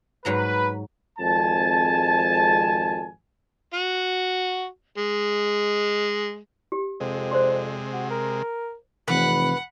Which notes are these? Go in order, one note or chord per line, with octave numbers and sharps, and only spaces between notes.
G#2 F#3 B4 A#5
G#1 F2 G#3 G#5 A5
F#4
G#3
G4
F2 C3 G#3
C5 D5 C6
F#4
A#4
F1 C3 E3 C4 B4 F#5